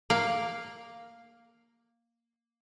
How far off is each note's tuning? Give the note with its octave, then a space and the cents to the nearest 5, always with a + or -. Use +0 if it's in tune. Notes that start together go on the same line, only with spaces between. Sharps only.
A#3 +0 F5 +0